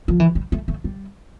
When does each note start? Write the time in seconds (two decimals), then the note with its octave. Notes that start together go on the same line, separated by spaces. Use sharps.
0.08 F3
0.20 E3
0.35 G3
0.52 A3
0.68 A3
0.84 G3